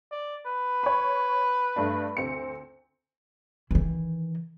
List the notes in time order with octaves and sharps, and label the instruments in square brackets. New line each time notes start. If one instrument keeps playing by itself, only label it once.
[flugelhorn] D5
B4
[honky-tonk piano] C#5 B5
G2 A3 D4
D2 C4 C#7
[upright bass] D#3 E3